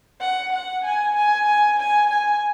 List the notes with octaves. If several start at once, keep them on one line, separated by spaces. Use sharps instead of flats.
F#5
F#5
G#5
G#5
G#5
G#5
G#5